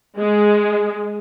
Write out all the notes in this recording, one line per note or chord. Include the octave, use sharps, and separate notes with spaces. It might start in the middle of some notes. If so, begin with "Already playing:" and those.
G#3